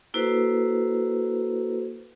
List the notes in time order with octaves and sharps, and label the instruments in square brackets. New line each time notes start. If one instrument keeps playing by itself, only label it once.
[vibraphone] A#3 E4 F#4 A4 B4 C5